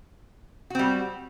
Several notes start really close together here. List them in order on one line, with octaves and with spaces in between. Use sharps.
F#4 C4 G3